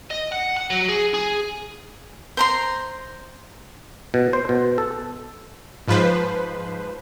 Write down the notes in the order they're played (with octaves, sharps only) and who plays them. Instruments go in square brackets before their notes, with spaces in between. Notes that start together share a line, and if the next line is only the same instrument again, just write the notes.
[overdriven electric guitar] D#5
F#5
F#5
F#3
G#4
G#4
[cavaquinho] C5 A#5 C6
[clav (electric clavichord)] B2
C5
B2
A4
[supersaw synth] G#2 F3 B4 C5